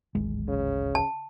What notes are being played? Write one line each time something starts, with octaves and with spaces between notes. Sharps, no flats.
D1 G#1 G#3
C#3
A5